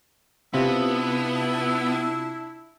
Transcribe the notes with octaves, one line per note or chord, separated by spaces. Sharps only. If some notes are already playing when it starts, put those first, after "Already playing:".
C3 B3 D4 E4 F4